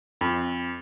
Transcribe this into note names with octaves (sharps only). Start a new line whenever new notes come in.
F2